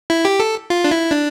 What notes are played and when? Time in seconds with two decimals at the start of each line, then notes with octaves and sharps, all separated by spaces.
0.10 E4
0.25 G4
0.40 A4
0.70 F4
0.84 D4
0.91 E4
1.11 D4